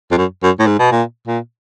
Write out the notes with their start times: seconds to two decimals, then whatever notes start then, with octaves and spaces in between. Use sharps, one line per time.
0.11 F2
0.18 F#2
0.43 F#2
0.59 A2
0.67 G#2
0.79 B2
0.92 A#2
1.27 A#2